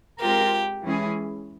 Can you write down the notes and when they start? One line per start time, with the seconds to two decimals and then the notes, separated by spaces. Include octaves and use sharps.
0.21 G#3 C4 F4 G4 A#4
0.84 E3 G#3 C#4 E4 G#4